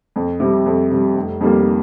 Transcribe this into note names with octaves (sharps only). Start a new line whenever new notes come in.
F2
C3 G3
F2
C3 G3
F1
F2 D#3 G3 A#3